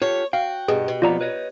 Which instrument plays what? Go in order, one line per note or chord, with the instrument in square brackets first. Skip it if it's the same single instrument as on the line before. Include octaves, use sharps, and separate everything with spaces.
[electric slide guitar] F4 G4 A4 [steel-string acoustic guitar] C#5
[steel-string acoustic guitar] F#4 [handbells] F5 [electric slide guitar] G5
[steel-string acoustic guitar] G2 B2 [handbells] G#4
[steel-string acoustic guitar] B2
[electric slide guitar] F2 F3 B3 [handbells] F4 D5 A#5
[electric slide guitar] B4 C#5 D#5